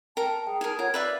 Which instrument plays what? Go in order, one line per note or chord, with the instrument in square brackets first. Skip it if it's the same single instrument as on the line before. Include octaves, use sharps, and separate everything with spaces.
[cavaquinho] A#4 [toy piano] G5 [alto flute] A5
[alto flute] G#4 [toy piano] G5
[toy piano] D#4 [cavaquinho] A#4 G#5
[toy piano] F4 F#5 [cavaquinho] A#4 [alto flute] C#5
[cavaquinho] B4 E5 F5 [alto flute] D5